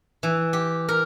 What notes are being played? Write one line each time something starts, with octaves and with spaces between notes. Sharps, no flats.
E3
G4
A#4